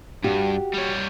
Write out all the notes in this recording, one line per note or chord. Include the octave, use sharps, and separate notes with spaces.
G2 F#4 G4
G3 C#5